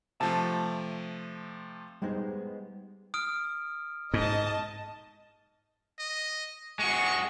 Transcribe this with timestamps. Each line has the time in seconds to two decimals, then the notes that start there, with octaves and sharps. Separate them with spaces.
0.21 C3 F3 A3 A5
2.02 G3 G#3 B3 D#4 C5
3.14 D#6 F6 D7
4.14 G#2 D#5 A5
5.99 D#5
6.79 G#3 F#4 C#6